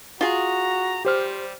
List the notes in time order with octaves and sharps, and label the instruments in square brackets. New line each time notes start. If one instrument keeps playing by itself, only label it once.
[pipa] F4 G#4 [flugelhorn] F#4 [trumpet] A#5
[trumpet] G3 [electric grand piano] G4 C5 F6